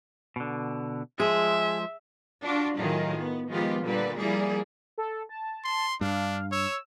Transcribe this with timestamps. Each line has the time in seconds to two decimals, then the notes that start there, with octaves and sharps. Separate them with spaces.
0.36 B2 D3
1.20 F3 G#3 G#4 E5
2.42 D4 F4 F#4
2.77 A2 D#3 F#3 F4 G#4
3.17 B3
3.49 D#3 F3 G#3 B3 F4 G4
3.82 A#2 D3 G3 B4 D5
4.16 F3 G3 A#3 E4 G#4 D5
4.98 A4
5.29 A5
5.64 C6
6.01 G2 D4 F5
6.52 C#5 E6